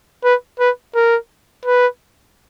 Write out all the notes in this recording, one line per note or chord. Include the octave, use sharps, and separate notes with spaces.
B4
B4
A#4
B4